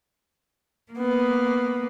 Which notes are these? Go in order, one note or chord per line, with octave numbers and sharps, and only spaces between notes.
A#3 B3